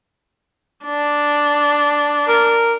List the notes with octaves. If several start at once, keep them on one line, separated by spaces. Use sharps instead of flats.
D4
A#4